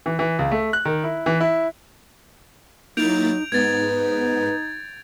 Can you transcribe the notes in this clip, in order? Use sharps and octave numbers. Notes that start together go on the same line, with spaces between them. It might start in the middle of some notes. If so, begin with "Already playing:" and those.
E3
E3
C#2
A3
F#6
D#3
E4
E3
E4
F#3 A#3 D#4 E4 G6 A6 D7 F7
G#2 B3 D#4 B4 G#6 A6